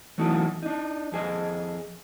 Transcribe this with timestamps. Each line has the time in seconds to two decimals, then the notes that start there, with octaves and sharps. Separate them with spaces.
0.18 E3 F#3 A3 D#4 F#4
0.63 D4 D#4
1.12 F2 G#4 D#5